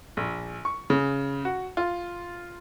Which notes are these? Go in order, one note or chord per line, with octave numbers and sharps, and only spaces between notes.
A#1
C#6
C#3
F#4
F4